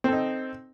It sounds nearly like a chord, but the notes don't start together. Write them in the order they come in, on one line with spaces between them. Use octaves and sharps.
C4 A4 D#4